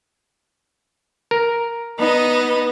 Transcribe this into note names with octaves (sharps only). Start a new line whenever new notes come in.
A#4
B3 D#4 D#5